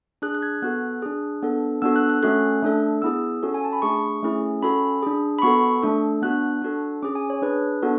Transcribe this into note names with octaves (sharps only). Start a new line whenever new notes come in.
D4 G#4 F#6
F#6
G#6
B3 F#4 A4 F#6
D4 G#4
B3 D4 A4
B3 D4 F#4 A4 E6
F#6
F#6
A3 C#4 F#4 A4 F#6
A3 D4 A4
B3 E4 G#4 E6
C#4 F#4 A4
G#5
A5
B5
A3 D4 G#4 C#6
A3 C#4 E4 G#4
C#4 F#4 A4 B5
D4 G#4
B5
B3 F#4 A4 C#6
A3 D4 A4
B3 D4 F#4 F#6
D4 F#4 A4
C#4 G#4 D6
G#5
C#5
D4 G#4 B4
B3 D4 F#4 A4